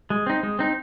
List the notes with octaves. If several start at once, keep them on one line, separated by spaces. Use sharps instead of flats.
G#3
C4 D#4
G#3
C4 D#4